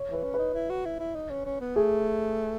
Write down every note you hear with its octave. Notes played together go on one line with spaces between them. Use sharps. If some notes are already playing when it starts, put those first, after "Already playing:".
Already playing: C#5
E3 B4
C#4
D#4 B4
E4
F#4
E4
E4
D#4
C#4
C#4
B3
A3 G#4